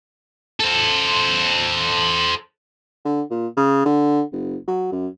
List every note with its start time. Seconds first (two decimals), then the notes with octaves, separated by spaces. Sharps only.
0.60 A4 C5
3.05 D3
3.31 A#2
3.57 C#3
3.85 D3
4.32 F#1
4.67 F#3
4.92 F#2